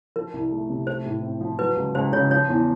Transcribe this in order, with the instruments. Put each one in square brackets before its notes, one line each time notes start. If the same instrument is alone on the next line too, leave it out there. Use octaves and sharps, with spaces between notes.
[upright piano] F3 [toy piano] A#4
[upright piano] C2
A3
C3
[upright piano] A3 [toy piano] C5
[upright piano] A2
C4
F3
[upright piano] F#3 [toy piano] B4
[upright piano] C#2
[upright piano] C#2 [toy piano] C5
[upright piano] C#3 [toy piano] C#5
[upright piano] F3 [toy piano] C#5
[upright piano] E2